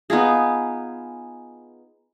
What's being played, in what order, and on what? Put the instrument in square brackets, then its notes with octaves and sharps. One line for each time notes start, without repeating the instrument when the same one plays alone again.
[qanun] B3 D#4 F4 G#4